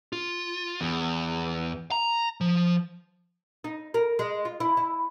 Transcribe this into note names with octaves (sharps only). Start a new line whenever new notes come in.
F4
E2
A#5
F3
D#4
A#4
G#3
F4
E4
E4